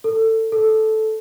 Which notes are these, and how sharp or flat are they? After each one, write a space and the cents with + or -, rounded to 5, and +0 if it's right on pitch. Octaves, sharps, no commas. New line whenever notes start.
A4 +20
A4 -10